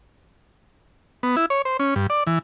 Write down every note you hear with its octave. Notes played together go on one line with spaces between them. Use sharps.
B3
E4
C#5
C5
C#4
G2
D5
E3